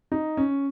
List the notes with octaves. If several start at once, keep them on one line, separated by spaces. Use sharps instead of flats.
D#4
C#4